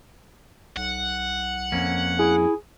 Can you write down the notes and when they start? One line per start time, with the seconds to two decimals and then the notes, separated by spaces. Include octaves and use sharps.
0.77 B1 F#5
1.72 F2 A#3 C#4
2.19 E4 G#4